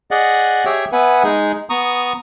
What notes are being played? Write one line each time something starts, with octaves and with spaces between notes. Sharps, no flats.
G#4 D5 D#5 F#5
G4 G#4 C#5 E5 G5
B3 B4 E5 F#5 G#5
G#3 D#4 G#4
B3 A#5 C#6 D#6